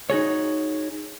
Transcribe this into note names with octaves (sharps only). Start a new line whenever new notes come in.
D#4 F#4 G#4 C#5